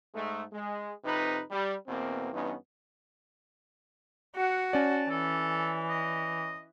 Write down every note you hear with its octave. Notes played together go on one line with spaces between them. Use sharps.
G#2 G#3 A3
G#3
F2 C3 D#4 B4
G3
E2 B2 A#3 C4
G2 E3 B3 C#4 D#4
F#4 F#5
C#4 D5 A5
E3 A4
D#5